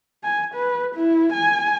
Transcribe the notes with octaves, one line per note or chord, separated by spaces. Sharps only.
G#5
B4
E4
G#5